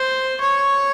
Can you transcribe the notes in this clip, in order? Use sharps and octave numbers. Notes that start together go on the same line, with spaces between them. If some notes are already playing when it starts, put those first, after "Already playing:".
Already playing: C5
C#5